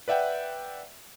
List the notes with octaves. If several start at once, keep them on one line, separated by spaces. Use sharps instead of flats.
B4 D5 E5 F#5 G5